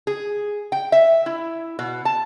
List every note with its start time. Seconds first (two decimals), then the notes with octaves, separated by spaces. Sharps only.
0.07 G#4
0.72 G5
0.92 E5
1.26 E4
1.79 B2
2.05 A5